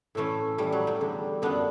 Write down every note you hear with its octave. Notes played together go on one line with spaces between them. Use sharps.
A2 E3 A3 C#4
A2 E3 G3
F#3
G3
E2 D3
F#2 D3 B3 D4